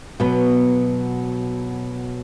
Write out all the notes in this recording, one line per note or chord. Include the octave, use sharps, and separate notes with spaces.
B2 F#3 B3